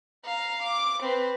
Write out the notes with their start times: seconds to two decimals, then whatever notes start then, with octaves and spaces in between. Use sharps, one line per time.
0.25 F5 A#5
0.63 D6
1.03 C4 B4